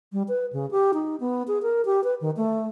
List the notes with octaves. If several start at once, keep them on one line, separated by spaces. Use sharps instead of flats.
G3
B4
C#3
G4
D#4
B3
G#4
A#4
G4
B4
D#3
A3